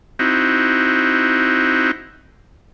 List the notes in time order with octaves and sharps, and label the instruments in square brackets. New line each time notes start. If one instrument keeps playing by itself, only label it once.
[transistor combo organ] C4 D#4 E4 F#4